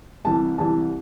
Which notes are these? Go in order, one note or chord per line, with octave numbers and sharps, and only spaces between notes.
C2 C3 E3 G3 A5
C2 C3 E3 G3 A5